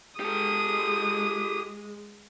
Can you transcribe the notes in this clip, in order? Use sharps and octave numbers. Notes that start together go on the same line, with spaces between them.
G#3 G4 A4 D#6